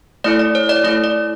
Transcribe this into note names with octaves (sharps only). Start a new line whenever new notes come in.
A3 E4 A4 D5
D5
C#5
D5
A3 E4 A4 D5
D5